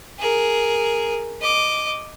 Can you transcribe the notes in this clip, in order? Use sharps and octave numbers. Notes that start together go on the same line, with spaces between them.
G#4 A#4
D#5 D6